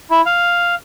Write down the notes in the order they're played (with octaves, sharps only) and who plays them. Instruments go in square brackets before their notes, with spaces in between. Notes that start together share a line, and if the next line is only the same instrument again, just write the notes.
[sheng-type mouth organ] E4
F5